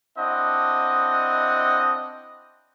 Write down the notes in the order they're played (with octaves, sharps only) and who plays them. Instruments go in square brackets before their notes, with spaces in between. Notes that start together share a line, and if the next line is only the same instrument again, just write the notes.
[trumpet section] C4 D4 E4 D#5 F#5